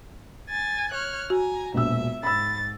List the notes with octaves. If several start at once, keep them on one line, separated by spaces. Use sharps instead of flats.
G#5 A6
C#5 F6 F#6
F#4 G#5 A#5
E1 A#1 E5 E6
G#2 B5 E6 A6